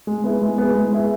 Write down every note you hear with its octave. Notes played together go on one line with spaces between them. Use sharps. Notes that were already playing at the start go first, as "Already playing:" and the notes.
G#3
B3 E4 G#4
G#3
B3 E4 G#4
G#3
B3 E4 G#4